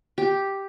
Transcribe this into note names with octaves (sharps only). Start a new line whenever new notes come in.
G4